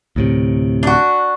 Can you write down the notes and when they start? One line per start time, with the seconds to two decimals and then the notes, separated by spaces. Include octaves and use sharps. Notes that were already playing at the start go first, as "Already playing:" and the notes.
0.16 D2 A2 C3
0.83 D4 F#4